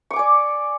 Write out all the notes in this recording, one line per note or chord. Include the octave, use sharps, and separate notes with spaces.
D5 G#5 C#6 D6